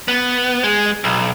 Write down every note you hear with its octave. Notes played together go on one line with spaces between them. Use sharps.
B3
G#3
B1